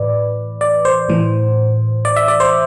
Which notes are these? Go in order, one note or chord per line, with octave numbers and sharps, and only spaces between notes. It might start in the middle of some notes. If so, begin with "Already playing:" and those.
Already playing: A2 E3 B4 D5
D5
C5
A2 E3
D5
E5
D5
C5